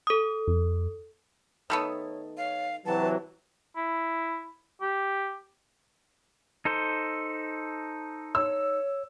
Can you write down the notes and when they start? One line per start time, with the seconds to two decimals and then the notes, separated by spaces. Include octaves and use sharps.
0.07 A4 D#6
0.47 F2
1.70 D#3 A3 B3 C#5
2.37 C#5 F5
2.86 C3 E3 F#3 B4 A5
3.76 E4
4.81 G4
6.65 D#4 A4 C5
8.35 C#5 E6